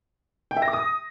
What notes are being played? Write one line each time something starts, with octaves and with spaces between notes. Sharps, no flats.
G5
E5
A#6
D6
D#6